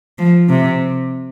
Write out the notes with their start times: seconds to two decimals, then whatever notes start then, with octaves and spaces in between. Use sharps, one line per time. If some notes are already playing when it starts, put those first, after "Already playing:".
0.19 F3
0.50 C3